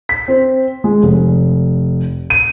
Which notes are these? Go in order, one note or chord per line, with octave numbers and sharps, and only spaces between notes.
B6
C4
G#3
F1
D#7